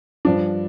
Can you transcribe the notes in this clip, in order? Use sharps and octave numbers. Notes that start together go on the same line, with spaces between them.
G2 F3 D4